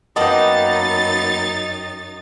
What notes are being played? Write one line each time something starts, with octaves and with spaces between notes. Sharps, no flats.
F#2 A#3 B3 D#4 D#5 G5 A5 A6